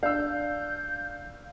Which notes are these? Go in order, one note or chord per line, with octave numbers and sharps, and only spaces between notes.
D4 F5 E6 G6